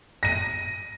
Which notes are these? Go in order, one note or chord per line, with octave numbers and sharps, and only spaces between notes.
A#6 D#7